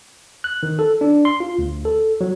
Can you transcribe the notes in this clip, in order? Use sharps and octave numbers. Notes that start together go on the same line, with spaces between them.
F#6
D#3
A4
D4
C6
F4
D2
A4
F#3